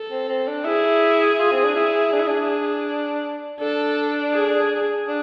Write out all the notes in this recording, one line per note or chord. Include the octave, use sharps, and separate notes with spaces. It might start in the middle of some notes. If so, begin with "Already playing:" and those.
Already playing: A4
C4
C4
D4
E4 G#4
F4
C4
D4
E4
D4
E4
D4
D4 A4
G#4
D4